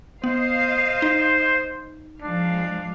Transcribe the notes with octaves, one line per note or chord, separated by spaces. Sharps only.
B3 C5 D#5 F5
D#4
F3 G#3 D4 F5